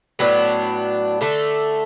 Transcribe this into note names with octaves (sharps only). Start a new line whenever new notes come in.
A2 F#3 B3 D4
D3 A3 A4